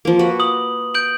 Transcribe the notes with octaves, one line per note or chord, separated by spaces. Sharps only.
F3 A#3
A#3 F#4 B4
D#6 F#7
G6 D7 F#7